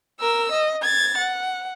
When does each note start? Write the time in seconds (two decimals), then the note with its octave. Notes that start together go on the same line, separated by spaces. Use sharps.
0.20 A#4 E6
0.51 D#5
0.82 G#6 A6
1.18 F#5